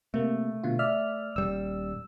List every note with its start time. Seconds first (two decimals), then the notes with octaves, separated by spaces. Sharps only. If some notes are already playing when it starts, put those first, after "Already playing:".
0.14 C3 A3 A#3
0.63 B2 D3 F4
0.79 D5 E5 F6
1.36 D#1 G3 E6